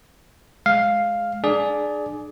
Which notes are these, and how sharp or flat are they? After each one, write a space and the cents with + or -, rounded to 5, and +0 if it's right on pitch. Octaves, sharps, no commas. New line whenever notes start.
G#3 +20 F5 +0
D4 +35 G#4 +20 D5 +0